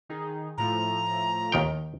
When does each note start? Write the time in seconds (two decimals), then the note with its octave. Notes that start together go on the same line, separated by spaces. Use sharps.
0.09 D#3 D#4 G#4
0.58 A2 F3 A3 A#5
1.52 D#2 D#3 G5